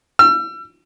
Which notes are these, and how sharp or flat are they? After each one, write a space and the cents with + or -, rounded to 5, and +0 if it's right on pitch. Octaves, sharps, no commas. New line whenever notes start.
E6 +40